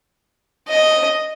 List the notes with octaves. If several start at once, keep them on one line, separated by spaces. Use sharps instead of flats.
D#5